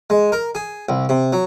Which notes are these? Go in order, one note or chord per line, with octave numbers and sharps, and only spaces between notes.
G#3
A#4
G#4
C2
C3
F#3